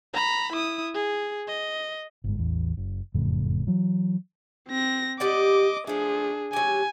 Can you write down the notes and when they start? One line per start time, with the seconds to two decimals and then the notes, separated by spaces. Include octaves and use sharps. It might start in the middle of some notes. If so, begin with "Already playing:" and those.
0.14 A#5 B5
0.53 E4 D#6
0.94 G#4
1.48 D#5
2.24 G1 G#2
2.38 A1 E2
2.77 F#1
3.14 F#1 F2 A2 C#3
3.67 E3 F#3
4.68 C4 A#6
5.20 G4 D5 D#5 F#5 D6
5.87 F3 A3 D4 G#4
6.53 F#3 G4 G#5